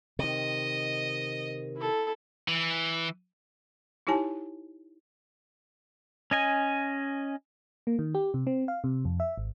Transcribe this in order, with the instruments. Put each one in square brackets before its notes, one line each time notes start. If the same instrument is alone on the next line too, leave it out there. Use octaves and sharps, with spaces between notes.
[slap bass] C3 D#3 [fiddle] D#5
[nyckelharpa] E4 A4
[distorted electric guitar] E3
[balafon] D#4 E4 G4 C#5 G#5 A5
[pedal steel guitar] C#4 D#5 G#5
[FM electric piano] A#3
D#3
G4
C3
C4
F5
C3
F2
E5
G#1